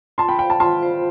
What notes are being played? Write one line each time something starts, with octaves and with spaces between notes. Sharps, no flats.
F4 A5 C6
G5 B5
C5 F5 G5
A5
F4 A5 C6
C5 F5